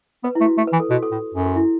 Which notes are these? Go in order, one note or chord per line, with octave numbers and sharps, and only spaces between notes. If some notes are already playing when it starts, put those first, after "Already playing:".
B3 B4
E4
A3
F#4
A3
B4
E3
A4
B2 F#4
A4
A2
F#2 A4
F#4
E4